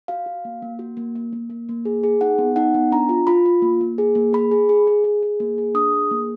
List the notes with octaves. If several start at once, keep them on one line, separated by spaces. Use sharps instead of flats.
F#4 F5
F#4
A#3
A#3
F#4
A#3
A#3
A#3
A#3
A#3
G#4
G#4
D#4 F#5
B3
D#4 F#5
B3
D4 A#5
F4
F4 B5
F4
A#3
A#3
G#4
A#3
G#4 B5
G#4
G#4
G#4
G#4
G#4
A#3
G#4
D4 D#6
G#4
A#3